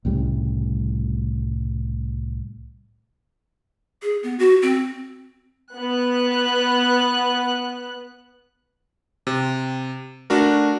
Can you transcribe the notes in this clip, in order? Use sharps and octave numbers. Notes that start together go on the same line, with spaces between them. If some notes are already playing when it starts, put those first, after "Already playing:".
C2 A2 C#3 G3
G#4
B3
F#4
C4
B3 F#6
C3
A3 D4 F#4 A#4